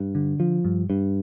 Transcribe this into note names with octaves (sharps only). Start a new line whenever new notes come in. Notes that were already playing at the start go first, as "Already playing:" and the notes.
Already playing: G2
D3
F3
G2
G2